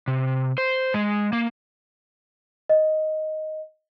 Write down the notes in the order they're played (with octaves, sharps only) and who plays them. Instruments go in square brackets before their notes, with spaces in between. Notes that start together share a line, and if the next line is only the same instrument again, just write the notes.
[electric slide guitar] C3
C5
G#3
A#3
[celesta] D#5